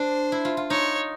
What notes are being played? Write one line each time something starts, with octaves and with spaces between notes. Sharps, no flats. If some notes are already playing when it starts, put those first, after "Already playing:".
Already playing: D4 C5
E4
F4
F4
D#4 C#5